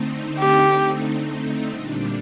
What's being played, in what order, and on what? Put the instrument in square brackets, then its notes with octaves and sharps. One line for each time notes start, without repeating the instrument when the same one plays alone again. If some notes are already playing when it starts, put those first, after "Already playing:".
Already playing: [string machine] D3 A3 C4 D#4
[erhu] G4
[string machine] A#2 G3 D4